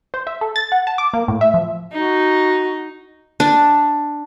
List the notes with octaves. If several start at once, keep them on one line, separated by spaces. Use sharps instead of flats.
C5
E5
A4
A6
F#5
A5
D6
A#3
A2
E5
F3
D#4 F#4
D4